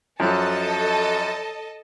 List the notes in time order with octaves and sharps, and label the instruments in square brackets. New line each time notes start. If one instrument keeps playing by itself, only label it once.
[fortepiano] F#2 F3 F#3 [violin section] A4 D#5 A5